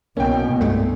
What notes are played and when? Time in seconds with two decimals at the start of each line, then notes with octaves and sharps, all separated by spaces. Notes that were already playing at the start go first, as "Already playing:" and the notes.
0.17 C2 B2 A#3 C#4 G5
0.61 C2 G2 G#3 A3